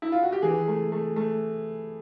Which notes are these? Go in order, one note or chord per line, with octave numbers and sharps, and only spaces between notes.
E4
F4
F#4
G4
E3 G#4
A3
A3
A3